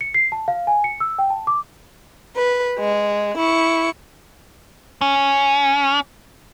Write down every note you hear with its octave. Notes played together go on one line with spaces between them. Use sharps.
C#7
C7
A5
F5
G#5
C#7
E6
G5
A5
D6
B4
G#3
E4 C#6
C#4